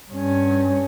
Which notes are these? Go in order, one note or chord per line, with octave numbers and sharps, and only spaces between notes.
G2 C#4